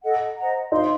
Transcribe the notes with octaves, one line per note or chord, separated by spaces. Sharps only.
A4 D#5 F#5
C5 D#5 F#5 A#5
D#4 C5 F5 C6